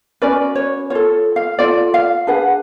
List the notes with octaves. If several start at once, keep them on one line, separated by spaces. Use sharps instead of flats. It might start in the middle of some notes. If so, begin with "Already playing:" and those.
C#4 F#4 B4 D5
C#5
F4 A4 C#5
F5
F4 A4 D5
F5
D4 G#4 B4 F#5